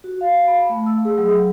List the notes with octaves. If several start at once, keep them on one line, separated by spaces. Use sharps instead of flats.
F#4
F5
B5
A3
E6
G#4
F#3